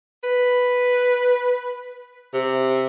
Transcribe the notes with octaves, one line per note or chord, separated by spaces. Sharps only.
B4
C3